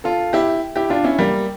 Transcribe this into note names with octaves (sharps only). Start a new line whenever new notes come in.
F4 A4
E4 G4
E4 G4
D4 F4
C#4 E4
G3 A#3